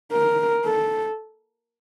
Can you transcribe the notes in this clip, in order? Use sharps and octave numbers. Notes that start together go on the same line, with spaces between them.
A#4
A4